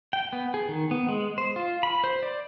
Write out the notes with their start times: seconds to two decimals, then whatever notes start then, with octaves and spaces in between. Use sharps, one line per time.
0.13 G5
0.33 B3
0.54 G#4
0.69 D#3
0.91 B3
1.09 G#3
1.38 C5
1.56 F4
1.83 B5
2.04 C5
2.23 D5